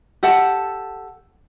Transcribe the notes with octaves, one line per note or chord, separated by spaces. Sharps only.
G4 A4 F#5 A5